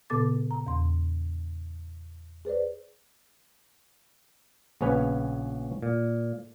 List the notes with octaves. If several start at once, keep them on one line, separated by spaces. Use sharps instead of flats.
A#2 C#3 B3 A4 D6 A6
A#5
E2 C6
G#4 B4 C5 D5
A#1 C#3 B3 C#4 B4 C#5
A#2